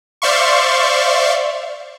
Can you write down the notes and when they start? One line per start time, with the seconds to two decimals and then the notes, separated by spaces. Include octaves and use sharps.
0.22 C5 D5 E5 F5 C6 C#6